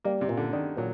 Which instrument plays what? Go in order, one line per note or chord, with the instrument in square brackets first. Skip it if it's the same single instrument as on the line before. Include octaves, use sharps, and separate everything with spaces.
[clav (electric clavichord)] G3 [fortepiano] A#3
[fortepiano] C3
[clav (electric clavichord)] A#2
[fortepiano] D3
[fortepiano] D#3 [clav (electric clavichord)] D4
[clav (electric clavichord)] A#2 [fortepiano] F#3